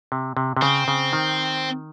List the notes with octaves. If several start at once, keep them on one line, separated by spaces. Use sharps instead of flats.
C3
C3
C3
C#3 C4
C#3
D#3